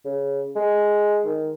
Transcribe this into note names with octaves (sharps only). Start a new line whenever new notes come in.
C#3
G#3
D#3